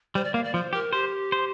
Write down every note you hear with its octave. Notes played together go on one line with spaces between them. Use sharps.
G3 C5
D5
A#3 F5
D5
F3 C5
G4 A#4
G4 C5
C5